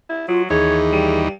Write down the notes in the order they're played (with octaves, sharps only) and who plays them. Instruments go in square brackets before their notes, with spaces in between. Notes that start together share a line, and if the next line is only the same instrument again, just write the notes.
[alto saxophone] E4
[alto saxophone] F#3 [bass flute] F4
[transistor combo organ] D#2 E3 D#4 [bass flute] G#4 [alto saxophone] C#5
[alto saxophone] G3